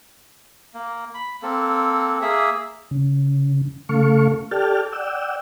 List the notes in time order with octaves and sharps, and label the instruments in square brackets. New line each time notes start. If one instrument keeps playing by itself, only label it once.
[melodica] A#3
B5
A#3 C4 A4
A#3 G#4 E5
[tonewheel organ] C#3
C#3 A3 A4 F5 C#6
G4 A4 D5 G5 A5 F6
D5 F#5 G5 E6